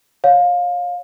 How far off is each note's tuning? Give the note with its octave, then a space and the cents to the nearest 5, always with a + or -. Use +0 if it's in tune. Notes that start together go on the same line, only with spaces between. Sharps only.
C#5 +0 F5 +25